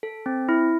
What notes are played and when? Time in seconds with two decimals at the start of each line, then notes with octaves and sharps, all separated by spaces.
0.03 A4
0.26 C4
0.49 E4